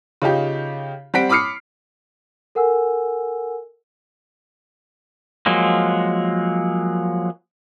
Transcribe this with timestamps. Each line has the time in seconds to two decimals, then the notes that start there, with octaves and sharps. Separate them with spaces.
0.22 C#3 D#4 F4 G4
1.14 G3 C4 F#5 B6 D7
1.29 B5 D6 D#6 F6 C7 C#7
2.55 A4 A#4 F#5 G#5 E6
5.46 F3 F#3 G#3 A#3